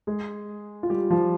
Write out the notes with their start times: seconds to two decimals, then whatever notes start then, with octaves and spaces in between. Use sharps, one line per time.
0.07 G#3 G#4
0.83 F4
0.90 G3 G4
1.10 F3 F4